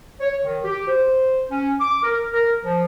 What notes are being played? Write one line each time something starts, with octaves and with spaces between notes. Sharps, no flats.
C#5
D#3
G4
C5
C#4
D6
A#4
A#4
F3